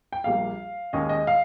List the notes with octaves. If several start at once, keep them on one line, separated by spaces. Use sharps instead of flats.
G5
A#1 A#2 G3 A#3 F5
D#2 D#3 G#3 C#4 D#5
D#5
F5